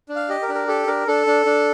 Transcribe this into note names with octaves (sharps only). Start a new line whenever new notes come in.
D4
F5
G4 D#5
A#4
D4
A#4
G4 A4
D4 A#4
D4 A4
D4
D4